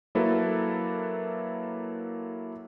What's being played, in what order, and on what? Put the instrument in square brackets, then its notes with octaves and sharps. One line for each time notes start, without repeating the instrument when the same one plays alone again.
[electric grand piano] F#3 A#3 E4 A4 B4